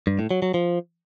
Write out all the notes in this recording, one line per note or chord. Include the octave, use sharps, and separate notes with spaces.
G2
A2
F#3
F#3
F3